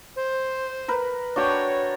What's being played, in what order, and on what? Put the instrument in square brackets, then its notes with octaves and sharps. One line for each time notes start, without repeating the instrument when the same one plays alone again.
[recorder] C5
[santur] A#4 B4
[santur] D4 F#4 G5 [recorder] C#5